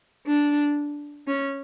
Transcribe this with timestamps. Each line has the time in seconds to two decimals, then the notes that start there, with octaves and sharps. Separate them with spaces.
0.26 D4
1.27 C#4